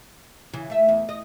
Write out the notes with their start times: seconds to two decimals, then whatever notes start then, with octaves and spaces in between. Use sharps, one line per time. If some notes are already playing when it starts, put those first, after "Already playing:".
0.53 C#3 E3
0.70 A3 E5
0.89 E2
1.09 D#5